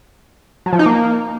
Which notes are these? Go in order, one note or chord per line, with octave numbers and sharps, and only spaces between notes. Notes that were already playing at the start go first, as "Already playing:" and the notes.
F#3
F3
D#4
A#3